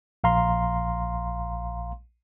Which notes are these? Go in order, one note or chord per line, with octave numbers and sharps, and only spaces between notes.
A#1 F5 A#5 C6